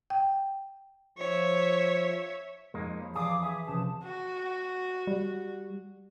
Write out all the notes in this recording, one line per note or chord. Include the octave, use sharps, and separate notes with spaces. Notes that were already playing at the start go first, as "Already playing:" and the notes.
G5
F3 C#5 E5
F2 G#3 A#3 D#4 D#7
C#5 B5 C6
E3 F3 D4 G#4 F5 D6 D#6
G#4 E5
C#2 C3 F3 A5
F#4
G3